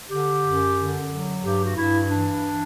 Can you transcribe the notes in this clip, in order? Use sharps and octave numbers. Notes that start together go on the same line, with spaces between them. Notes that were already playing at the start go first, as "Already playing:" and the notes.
D3 G4
F#2
D3
F#3
G2 G4
F#4
G2 E4
E3 D4